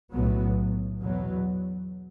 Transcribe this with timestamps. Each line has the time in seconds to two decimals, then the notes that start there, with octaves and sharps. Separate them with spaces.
0.12 B1 A2 F#3 B3
1.00 E2 B2 F#3 B3